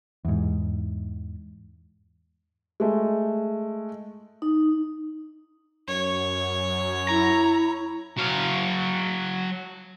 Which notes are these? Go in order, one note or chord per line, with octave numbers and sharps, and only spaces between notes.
E2 G#2
G#3 A3
D#4
F#2 C#5
E4 A#5
F#3 F5